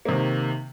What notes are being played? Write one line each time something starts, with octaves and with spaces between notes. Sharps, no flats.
C3 D#3 A#3